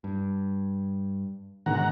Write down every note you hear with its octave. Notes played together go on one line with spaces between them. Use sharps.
G2
G#2 B2 D3 D#3 F#5 A#5